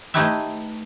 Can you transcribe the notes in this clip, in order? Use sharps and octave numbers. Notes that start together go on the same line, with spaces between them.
A3 D#4 E4 G4 B4 E5